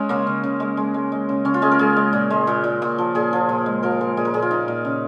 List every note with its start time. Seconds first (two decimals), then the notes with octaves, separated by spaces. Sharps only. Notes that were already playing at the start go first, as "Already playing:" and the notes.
Already playing: G#3 C#4
0.09 C#3 A#3
0.27 C#3
0.44 C#3
0.60 G#3
0.77 G#3
0.94 G#3
1.12 G#3
1.29 C#3
1.45 C#3 C#4
1.54 F4
1.62 G#3 G#4
1.72 A#4
1.79 G#3 G#4
1.96 G#3
2.13 A#2
2.30 G#3
2.47 A#2
2.64 A#2
2.82 A#2
2.98 F3
3.15 A#2 G#4
3.33 F3
3.49 A#2
3.66 G#3
3.83 F3 A#4
4.01 G#3 A#4
4.17 A#2 G#4
4.25 A#4
4.34 A#2 G#4
4.42 F4
4.50 A#2 D#4
4.68 A#2
4.85 C#3